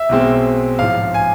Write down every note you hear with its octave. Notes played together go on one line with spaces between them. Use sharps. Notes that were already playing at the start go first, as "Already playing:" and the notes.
Already playing: E5
B1 B2 G#3 C4
A1 G#2 F3 F5
G#5